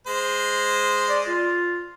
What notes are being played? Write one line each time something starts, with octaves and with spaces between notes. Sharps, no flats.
G#3 C5
D5
F4